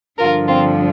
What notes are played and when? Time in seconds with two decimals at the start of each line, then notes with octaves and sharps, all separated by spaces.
0.19 G2 D3 F3 F4 A#4
0.48 C4 F4